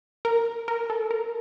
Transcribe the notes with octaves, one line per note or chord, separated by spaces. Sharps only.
A#4
A#4
A4
A#4